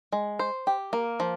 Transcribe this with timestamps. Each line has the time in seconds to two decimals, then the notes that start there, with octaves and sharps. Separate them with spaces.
0.12 G#3
0.39 C5
0.67 G4
0.93 A#3
1.20 F3